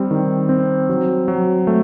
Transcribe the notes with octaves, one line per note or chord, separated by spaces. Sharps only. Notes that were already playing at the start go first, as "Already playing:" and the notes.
Already playing: G3 C4
D#3
C4
F#3
F#3
A3